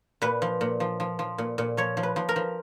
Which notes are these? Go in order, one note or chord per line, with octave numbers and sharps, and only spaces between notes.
A#2 B4
F3
A#2
F3
F3
F3
A#2
A#2
F3 C#5
F3
B4
F3
A#4
F3